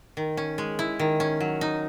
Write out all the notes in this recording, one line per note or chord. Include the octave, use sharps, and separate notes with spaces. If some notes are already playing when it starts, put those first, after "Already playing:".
D#3
C#4
G#3
E4
D#3
C#4
F#3
D#4